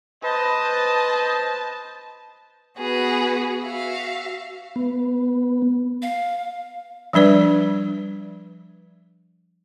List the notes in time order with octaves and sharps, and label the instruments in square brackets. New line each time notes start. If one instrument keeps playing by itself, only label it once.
[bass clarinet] B4 [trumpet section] C5 D#5 [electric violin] A5
[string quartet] B3 F#4 G#4 B4
F#4 E5 F5
[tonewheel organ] B3
[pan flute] F5
[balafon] F3 G3 D4 B4 D5